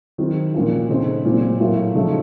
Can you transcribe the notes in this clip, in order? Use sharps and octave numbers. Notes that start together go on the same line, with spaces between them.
D#3 F#3 C4
A#2 F3 A#3 C#4 F4
C#3 A3 C4 D#4
A#2 F#3 C4
A2 F#3 A#3 F4
C#3 F3 A3 D#4